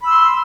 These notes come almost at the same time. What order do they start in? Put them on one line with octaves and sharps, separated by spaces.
B5 E6 C6